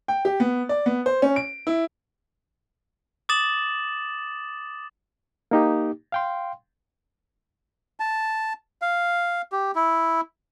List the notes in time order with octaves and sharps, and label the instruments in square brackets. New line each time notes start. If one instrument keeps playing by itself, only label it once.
[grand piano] G5
G4
B3
D5
B3
C5
C#4
D7
E4
[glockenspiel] D6 D#6 A6 E7 F#7
[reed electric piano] A#3 D#4 G4
F5 G5 C6
[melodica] A5
F5
G4
E4